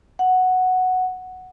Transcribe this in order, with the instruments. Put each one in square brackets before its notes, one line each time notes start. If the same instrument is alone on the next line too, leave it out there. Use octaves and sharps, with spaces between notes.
[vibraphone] F#5